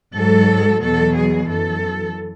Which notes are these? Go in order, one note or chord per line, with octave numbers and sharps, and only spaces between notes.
G#2 F#3 A4
E2 B2 F#3 A4
G#4
F#2 E3 A4